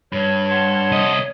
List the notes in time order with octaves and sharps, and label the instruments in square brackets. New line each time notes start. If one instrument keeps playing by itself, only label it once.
[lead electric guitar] G2 [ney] C#5
[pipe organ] F#5 A5 C6
[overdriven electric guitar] C2 D#5